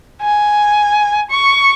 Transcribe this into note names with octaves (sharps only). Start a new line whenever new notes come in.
G#5
C#6